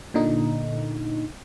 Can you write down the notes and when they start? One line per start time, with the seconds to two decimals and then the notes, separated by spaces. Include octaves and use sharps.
0.14 A#2 D3 D#4